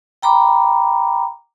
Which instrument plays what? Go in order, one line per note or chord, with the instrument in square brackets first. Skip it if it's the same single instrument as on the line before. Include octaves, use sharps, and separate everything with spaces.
[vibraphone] G5 A#5 B5 D6